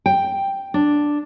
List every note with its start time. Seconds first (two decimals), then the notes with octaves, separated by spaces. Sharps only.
0.06 G5
0.74 D4